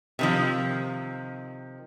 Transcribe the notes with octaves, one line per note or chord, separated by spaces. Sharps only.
C3 D#3 F3